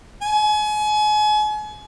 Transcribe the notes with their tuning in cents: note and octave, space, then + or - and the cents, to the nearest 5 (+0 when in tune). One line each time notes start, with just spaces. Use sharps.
G#5 +35